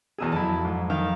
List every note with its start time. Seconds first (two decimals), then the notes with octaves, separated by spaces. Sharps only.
0.18 E2 B2 G#4 A#5 E6 D#7
0.32 F2 F#3 E4 A5
0.65 G#2
0.90 D#3 F5